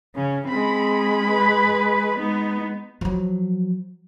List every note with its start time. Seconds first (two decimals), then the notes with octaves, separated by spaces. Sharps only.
0.16 C#3 C#4
0.48 G#3 C4 B5
1.28 B4
2.19 G#3 B3 D#4
3.01 F3 F#3